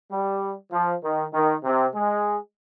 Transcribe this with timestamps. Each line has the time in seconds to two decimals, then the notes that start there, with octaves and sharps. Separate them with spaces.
0.11 G3
0.72 F3
1.03 D#3
1.33 D#3
1.64 C3
1.94 G#3